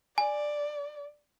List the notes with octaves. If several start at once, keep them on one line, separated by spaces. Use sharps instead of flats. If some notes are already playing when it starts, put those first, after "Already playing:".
D5 G#5